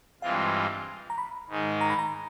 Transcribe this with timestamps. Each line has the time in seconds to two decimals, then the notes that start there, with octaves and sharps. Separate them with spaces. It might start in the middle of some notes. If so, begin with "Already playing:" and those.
0.22 G2 E3 G#3 C4 F4 F5
1.10 A#5
1.18 B5
1.49 G#2 D#3 G#3
1.81 A#5
1.90 B5
1.99 A#5